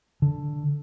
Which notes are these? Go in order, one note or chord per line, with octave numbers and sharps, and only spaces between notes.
D3